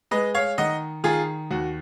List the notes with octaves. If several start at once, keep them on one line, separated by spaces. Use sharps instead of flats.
G#3 B4 D#5
C#5 F5
D#3 D#5 F#5
D#3 F4 G#4
D#2 F#4